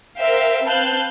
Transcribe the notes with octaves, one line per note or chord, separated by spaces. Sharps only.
A#4 C5 E5 F5 G5
C4 B4 F5 A5 F#6 G6